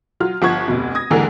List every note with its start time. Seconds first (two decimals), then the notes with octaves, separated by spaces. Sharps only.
0.20 F#3 F4 F6
0.42 G1 F3 F#5 C#6 G#6
0.68 F1 D2 B2
0.95 D#6 G#6 A#6
1.10 D#2 G#2 D3 E3 G#3 A#4